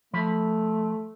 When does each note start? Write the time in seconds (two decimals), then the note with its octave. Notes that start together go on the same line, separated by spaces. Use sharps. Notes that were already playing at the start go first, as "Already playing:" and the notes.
0.13 F3 A3 B5